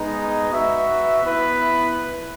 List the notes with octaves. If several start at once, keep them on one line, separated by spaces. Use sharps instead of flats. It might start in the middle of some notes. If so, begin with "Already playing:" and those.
Already playing: G#3 B3 D#4
F#4 B4 E5
B3 E4 B4